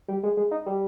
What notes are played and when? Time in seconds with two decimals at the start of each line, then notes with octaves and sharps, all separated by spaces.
0.08 G3
0.23 G#3
0.37 G#3
0.51 D#4
0.66 G3